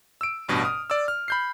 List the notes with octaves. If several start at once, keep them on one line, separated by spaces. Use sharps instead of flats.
E6 D7
A1 G2 B2
D#6 F6
D5 D6 E6
F6
B5 G6 C7